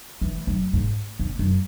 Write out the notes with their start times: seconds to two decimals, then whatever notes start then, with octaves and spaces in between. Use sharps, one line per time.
0.21 E3
0.47 F#2
0.73 G#2
1.20 E2
1.39 F#2